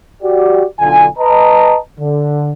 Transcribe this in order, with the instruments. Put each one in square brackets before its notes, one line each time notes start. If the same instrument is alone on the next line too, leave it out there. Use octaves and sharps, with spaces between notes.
[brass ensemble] F#4 G4 D5
B1 D3 D4 F4 G#5
B4 D#5 A5 A#5
D3